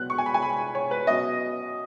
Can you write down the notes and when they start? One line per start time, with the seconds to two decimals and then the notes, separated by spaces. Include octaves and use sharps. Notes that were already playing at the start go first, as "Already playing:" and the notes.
Already playing: B2 F#3 B3 F#6
0.10 C#6
0.18 G#5
0.26 B5
0.34 G#5
0.42 B5
0.75 C#5
0.91 B4
1.07 B2 F#3 C#4 D#5